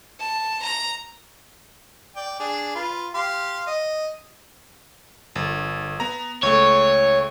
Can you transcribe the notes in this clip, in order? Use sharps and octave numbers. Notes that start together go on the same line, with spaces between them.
A5
A#5
D5 G5
D4 G#4
F4 B4
G4 F5 C6
D#5
G1
B3 A#5
C#2 A3 C#5